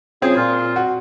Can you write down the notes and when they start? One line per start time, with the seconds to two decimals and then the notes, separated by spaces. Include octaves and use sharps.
0.22 C#3 C4 F4 G#4
0.37 A#2 F4
0.76 F#4